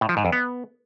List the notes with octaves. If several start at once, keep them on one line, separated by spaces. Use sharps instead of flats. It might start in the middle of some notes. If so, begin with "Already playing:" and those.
A2
F3
G#2
F2
B3